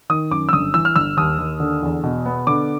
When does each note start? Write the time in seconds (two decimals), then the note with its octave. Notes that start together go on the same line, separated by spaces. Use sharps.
0.10 D#3 D#6
0.31 F#2 D6
0.49 E6
0.53 G1 D#6
0.74 E3 E6
0.85 F6
0.96 G1 E6
1.17 D#2 D#6
1.39 D#2
1.60 D3
1.83 E2
2.04 B2
2.26 B3
2.47 D3 D6